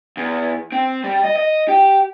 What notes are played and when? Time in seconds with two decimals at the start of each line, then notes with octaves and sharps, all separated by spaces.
0.17 E2
0.72 C4
1.04 G3
1.23 D#5
1.36 D#5
1.68 G4